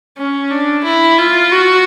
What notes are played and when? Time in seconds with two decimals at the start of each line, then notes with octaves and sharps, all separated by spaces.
0.18 C#4
0.51 D4
0.85 E4
1.18 F4
1.52 F#4